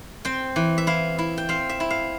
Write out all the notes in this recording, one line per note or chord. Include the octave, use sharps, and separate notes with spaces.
C4 G5
E3
E5
E4 F5
E4
G5
C4 F5
E5
E4
F5